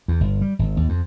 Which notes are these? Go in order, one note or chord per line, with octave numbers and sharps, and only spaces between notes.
E2
G1
G3
G#1
D#2
F2